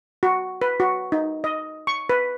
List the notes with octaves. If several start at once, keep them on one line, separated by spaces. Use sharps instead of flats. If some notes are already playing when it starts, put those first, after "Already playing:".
F#4
B4
F#4
D#4
D#5
C#6
B4